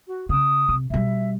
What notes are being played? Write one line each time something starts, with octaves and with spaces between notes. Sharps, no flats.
F#4
C#3 D#6
C3
B2 G3 E5